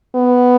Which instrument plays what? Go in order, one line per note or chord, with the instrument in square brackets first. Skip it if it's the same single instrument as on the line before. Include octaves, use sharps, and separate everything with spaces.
[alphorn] B3